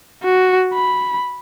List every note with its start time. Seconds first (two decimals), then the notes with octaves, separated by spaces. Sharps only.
0.24 F#4
0.73 B5